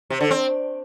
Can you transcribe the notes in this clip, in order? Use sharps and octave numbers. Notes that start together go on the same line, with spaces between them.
C3
D3
C4